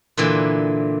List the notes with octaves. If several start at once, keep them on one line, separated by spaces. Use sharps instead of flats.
A#2 D3 E3 A#3